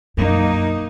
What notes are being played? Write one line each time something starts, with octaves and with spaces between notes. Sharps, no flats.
F#2 B2 A#3 D#4